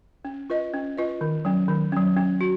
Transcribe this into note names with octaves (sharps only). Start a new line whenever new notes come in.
C#4
F4 B4 D#5
C#4
F4 B4 D#5
D#3
F#3 C#4
D#3
F#3 C#4
C#4
F#4